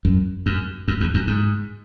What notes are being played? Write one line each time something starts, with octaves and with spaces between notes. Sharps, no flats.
F#2
F#2
F#2
E2
F#2
G#2